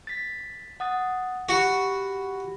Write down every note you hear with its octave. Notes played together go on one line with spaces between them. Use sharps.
A6 B6
F#5 D#6 A6
F#4 G4 B5